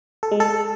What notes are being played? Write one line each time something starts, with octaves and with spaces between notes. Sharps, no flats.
A4
G#3
A4